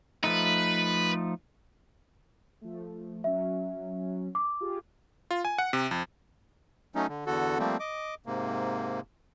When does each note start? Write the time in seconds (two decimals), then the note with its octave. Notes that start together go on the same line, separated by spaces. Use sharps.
0.24 F3 A3 D#4 B4
2.61 F3 A3
3.24 F#3 C#4 E5
4.35 D6
4.60 F4 G4 G#4
5.31 F4
5.45 G#5
5.58 F#5
5.73 C3
5.91 F2
6.95 F#3 A3 C#4 D#4
7.09 D3
7.27 E2 D3 F#4 A4
7.59 F3 G3 A3 A#3 C4
7.80 D#5 D6
8.26 G#2 C3 A#3